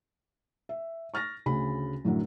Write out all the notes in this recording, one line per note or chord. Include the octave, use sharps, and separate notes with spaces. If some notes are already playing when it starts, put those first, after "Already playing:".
E5
C#6 F6 A6 A#6
D2 C#3 B5
F#2 A2 D3 F#3